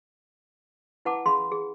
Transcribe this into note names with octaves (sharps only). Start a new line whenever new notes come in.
E4 B4 F#5 A5 D6
C#4 G#4 F5 B5 C6
G#4